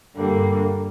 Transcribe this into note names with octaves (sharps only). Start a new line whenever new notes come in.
G2 D3 G3 A#3